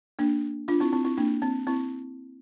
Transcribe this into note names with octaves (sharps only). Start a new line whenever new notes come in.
A#3 D4
D4 F4
C4 E4
C4 E4
C4 E4
A#3 D4
C4
C4 E4